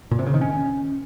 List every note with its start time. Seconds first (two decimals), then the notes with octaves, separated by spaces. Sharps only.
0.11 A#2
0.19 C3
0.26 C#3
0.34 D#3
0.41 C#4